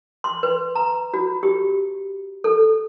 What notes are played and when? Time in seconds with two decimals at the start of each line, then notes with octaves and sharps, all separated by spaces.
0.24 C6
0.43 B4
0.75 A#5
1.14 F#4
1.43 G4
2.44 A4